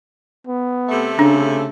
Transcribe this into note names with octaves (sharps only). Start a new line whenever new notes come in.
B3
C3 A3
C#3 D4